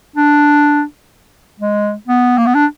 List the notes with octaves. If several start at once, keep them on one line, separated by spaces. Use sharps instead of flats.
D4
G#3
B3
A#3
B3
D4